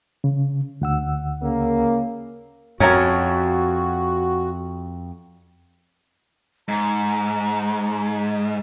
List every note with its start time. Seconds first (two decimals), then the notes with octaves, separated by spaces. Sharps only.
0.24 C#3
0.82 D2 F#5 E6
1.42 C#3 A#3
2.80 F2 C#4 F#4 A#4 G#5
6.68 G#2 A#5